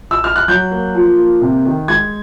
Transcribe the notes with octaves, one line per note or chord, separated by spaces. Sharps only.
E6
F6
F#6
F#3 G6
A#3
F3
A#3
C3
D#3
G#3 G#6